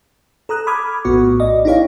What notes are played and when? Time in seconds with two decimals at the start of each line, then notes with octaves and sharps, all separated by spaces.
0.49 A4 A#5 D#6 F#6
0.67 B5 D6 D#6 F6 G#6
1.05 A#1 A2 B3 F#4 C#6
1.40 D5 D#5
1.65 D#4 E4 G4 C#5 F5